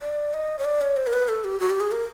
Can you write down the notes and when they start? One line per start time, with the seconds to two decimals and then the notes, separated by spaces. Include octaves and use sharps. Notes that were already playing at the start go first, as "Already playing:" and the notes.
0.02 D5
0.34 D#5
0.59 C#5
0.65 D5
0.81 C#5
0.97 C5
1.07 A#4
1.13 B4
1.28 A4
1.44 G4
1.60 F#4
1.70 G4
1.80 G#4
1.92 A#4